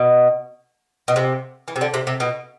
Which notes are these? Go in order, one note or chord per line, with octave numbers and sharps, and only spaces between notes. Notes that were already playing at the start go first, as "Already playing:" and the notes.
Already playing: B2
B2
C3
E3
C3
D3
C3
C3
B2